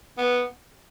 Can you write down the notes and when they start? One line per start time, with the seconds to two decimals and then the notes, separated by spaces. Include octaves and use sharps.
0.17 B3